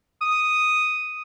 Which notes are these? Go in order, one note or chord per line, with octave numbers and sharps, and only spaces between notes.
D#6